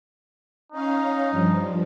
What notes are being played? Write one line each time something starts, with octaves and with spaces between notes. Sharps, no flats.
C#4 D#4 F5
G2 F3